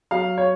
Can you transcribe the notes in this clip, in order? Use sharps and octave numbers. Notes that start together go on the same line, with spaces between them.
F#3 F5
C#5